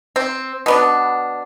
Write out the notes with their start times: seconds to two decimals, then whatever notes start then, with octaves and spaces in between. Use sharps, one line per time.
0.16 C4
0.66 B2 B3 D4